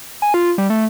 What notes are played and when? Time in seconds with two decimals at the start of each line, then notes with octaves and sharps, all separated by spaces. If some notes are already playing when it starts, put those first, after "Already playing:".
0.22 G#5
0.34 F4
0.58 G3
0.70 A3